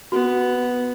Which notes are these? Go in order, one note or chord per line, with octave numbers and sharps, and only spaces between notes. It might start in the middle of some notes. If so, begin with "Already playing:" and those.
B3 F#4